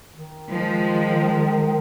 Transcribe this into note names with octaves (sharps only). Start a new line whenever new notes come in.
D#3
F3 G#3